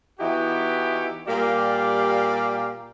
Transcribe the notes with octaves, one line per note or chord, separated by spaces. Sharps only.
E3 B3 D#4 E4 F#4 G4
A#2 G3 A#3 G4 D5 F5